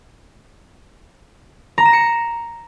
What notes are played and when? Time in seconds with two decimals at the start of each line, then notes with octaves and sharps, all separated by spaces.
1.78 A#5
1.85 E7
1.93 C#7